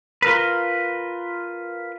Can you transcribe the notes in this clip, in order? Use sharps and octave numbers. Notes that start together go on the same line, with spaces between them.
F4 A#4 B4